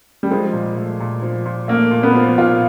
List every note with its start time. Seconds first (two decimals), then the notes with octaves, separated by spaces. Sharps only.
0.23 G3
0.31 F3 G#3
0.53 A#2
0.77 A3
1.00 A#2
1.22 F3
1.46 A#2
1.68 A3 A#3
1.91 A#2
2.03 B3
2.15 F3
2.38 A#2 F4